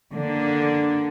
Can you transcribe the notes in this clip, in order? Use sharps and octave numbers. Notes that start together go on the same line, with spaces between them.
D3 A#3 D4